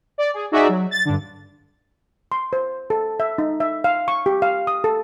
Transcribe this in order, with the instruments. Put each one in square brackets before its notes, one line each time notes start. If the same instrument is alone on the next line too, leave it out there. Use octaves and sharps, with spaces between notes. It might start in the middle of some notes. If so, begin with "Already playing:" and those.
[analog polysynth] D5
G#4
D#4 F#4 G#4 D5 E5
F#3
A6
G2 D3
[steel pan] C6
C5
A4
E5
D#4
E5
F5
C#6
G4
F5
D#6
A4